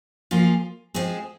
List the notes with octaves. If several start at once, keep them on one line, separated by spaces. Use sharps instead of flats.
F3 A#3 F4 G#4
F3 G#3 C4 G#4